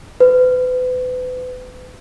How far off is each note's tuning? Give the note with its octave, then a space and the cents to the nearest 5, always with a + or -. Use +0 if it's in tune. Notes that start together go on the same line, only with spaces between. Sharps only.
B4 +35